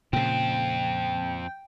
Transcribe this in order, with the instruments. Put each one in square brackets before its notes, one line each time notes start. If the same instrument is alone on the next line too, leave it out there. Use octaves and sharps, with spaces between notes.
[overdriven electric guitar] F2 C4 [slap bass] A#2 C#3 [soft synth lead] G5